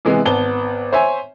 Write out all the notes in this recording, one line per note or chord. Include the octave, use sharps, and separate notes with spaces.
C3 E3 G#3 B3
G#1 B3 A5 G7
C5 C#5 E5 G#5